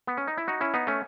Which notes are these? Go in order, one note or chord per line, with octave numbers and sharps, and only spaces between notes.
B3
C#4
D#4
E4
D#4 F#4
C#4 E4
B3 D#4
A3 C#4